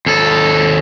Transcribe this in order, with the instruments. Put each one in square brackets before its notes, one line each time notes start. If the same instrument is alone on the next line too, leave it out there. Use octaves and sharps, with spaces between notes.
[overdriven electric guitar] D#2 A4